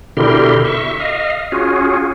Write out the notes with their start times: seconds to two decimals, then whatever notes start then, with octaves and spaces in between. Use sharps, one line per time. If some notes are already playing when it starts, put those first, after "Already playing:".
0.17 B2 D3 E4 G4 A#4 C6
0.65 E5 C#6
1.00 D#5 F5
1.52 C#4 F4 F#4 G#4